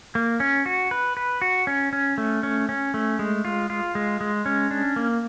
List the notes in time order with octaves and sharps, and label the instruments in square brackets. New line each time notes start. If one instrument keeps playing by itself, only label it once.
[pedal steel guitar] A#3
C#4
F#4
B4
B4
F#4
C#4
C#4
A3
C#4
C#4
A3
G#3
F4
F4
G#3
G#3
C#4
D4
A#3